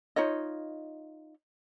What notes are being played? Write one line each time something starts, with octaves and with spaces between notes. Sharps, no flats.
D#4 F4 C#5 D#5